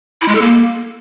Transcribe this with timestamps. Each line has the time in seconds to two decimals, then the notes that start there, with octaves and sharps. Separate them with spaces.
0.21 E4
0.28 G#3
0.35 A4
0.42 A#3